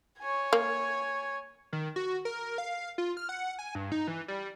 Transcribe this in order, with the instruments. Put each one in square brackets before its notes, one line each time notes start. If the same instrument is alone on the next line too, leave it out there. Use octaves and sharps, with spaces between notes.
[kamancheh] C#5 G#5
[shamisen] A#3
[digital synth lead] D#3
F#4
A#4
F5
F4
F6
F#5
G#5
G2
D#4
E3
G3